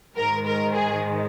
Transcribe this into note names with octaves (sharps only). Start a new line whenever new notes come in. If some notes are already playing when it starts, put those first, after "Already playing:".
G#2 D#3 G#3 A#4
A#4
G#4